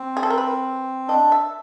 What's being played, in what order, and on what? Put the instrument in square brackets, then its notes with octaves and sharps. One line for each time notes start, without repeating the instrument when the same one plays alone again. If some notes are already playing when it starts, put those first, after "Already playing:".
Already playing: [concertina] C4
[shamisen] G#4
A4
A#4
B4
[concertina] D4 [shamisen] D#5
[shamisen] E5